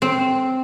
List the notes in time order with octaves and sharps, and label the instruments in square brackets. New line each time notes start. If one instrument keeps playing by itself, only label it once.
[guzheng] C4